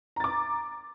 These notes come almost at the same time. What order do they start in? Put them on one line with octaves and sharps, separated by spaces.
A#5 A6 D6